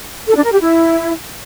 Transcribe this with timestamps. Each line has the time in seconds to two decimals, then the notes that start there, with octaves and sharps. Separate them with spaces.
0.28 A4
0.36 D4
0.44 A#4
0.52 G4
0.60 E4